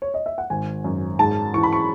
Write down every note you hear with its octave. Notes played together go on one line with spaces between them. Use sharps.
C#5
D#5
E5
F#5
G#1 G#5
F#2
G#2 A5
E3 C#6
B5
C#6